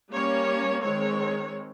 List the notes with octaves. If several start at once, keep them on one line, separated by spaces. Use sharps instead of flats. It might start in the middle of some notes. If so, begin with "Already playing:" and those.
G3 A#3 C#4 C#5
D#3 G#3 C4 C#5